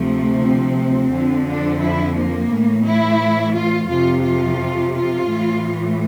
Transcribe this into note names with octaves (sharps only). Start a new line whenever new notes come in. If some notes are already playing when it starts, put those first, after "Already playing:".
Already playing: D2 C3 F3 A3
C4
F2 D3 F3
D4
E4
A#3
A2 E3
E4
F4
F2 C3 F3 F4
F4
F4
A2 E3